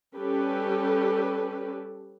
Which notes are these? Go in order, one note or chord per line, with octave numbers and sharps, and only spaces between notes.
G3 C#4 G4 A4 B4